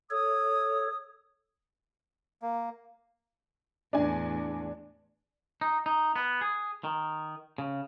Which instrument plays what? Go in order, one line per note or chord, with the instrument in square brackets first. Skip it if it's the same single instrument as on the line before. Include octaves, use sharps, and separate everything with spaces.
[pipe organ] A4 C#5 [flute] D#6
[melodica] A#3
[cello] E2 A2 [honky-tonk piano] D4 G#5
[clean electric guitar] D#4
D#4
B3
G#4
D#3
C#3